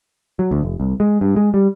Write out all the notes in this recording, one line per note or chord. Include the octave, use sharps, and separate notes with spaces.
F#3
D2
F1
C2
G#3
G2
G#3
G3